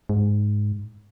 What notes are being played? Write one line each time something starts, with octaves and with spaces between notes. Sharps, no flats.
G#2